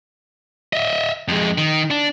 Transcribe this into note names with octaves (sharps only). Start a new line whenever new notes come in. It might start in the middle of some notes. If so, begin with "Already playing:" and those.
D#5 E5
F2 G#3
D#3
D4